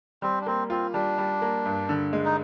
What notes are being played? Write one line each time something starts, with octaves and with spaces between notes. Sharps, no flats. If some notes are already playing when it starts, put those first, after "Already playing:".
G3 C4
D4
A#3 C4
C4 F4
G3 D4
G3
A#3
G2
D3
G#3
D#4